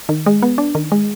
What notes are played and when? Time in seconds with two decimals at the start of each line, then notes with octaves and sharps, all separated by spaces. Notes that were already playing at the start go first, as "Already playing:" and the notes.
0.09 D#3
0.26 G#3
0.43 B3
0.58 D4
0.75 D#3
0.92 G#3